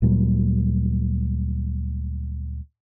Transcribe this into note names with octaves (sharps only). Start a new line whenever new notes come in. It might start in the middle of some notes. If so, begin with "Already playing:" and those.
D2 A#2 F#3 G3